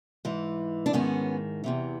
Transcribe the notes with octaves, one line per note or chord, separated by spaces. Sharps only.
G#2 E3
D4
G#2 D#3 B3 C#4
E2 C3 E3